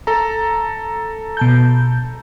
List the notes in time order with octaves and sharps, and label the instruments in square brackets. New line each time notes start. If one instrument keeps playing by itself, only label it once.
[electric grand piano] A4 A#5
[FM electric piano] B2 A5 G6